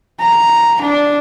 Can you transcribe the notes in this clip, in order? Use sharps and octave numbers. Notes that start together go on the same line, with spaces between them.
A#5
D4